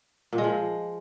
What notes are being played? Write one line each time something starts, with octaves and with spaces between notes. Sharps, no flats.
A#2
G#3
F3